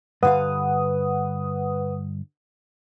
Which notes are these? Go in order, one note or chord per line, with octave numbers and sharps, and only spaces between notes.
G2 D3 B4 F5 F#5 D#6